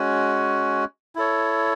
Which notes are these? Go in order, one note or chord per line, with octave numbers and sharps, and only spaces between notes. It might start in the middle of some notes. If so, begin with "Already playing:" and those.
Already playing: G#3 C#4 F#4
E4 A4 C#5